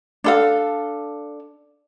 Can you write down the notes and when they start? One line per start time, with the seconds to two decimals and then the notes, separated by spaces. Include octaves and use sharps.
0.24 D4 A4 F5